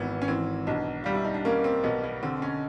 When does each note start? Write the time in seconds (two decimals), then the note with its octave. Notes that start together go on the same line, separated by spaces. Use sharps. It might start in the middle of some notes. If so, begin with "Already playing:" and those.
Already playing: G#1 E3 B3
0.22 C#4
0.28 E3 C4
0.67 B1 D4
1.04 G3 F4
1.15 E4
1.25 D#4
1.34 D4
1.45 A#3 C#4
1.64 C4
1.84 B1 B3
2.04 B3
2.23 D3 C4
2.42 C#4